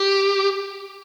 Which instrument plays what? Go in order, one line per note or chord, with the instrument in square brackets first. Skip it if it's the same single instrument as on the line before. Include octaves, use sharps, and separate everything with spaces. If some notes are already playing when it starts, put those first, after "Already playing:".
Already playing: [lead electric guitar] G4